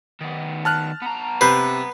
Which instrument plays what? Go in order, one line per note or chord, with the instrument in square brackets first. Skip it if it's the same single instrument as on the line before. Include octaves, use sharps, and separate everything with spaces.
[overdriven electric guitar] D#3 B3
[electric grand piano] A5 F6 F#6
[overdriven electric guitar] B3 A#5
[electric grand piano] C3 G6 C7 [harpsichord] B4